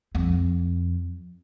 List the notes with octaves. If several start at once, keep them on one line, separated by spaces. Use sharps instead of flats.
F2